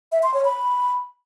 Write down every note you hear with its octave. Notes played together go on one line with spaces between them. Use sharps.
E5
C6
C#5
B5